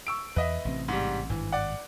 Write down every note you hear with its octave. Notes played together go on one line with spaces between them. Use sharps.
C#6 E6 D7
E2 B4 D#5 E5
A1 C3 C4
G#2 G3
G#1 G2 E3
D5 F#5